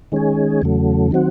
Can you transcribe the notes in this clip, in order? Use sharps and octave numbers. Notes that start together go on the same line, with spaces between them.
D#3 G#3 C#4 G#4
E2 C#3 F#3 A3
D#3 F#3 C4 F#4